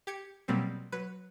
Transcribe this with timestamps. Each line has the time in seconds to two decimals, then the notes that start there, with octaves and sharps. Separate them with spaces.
0.07 G4 G#6 C#7
0.48 B2 F#3 G3 A#3 C4
0.92 F#3 B4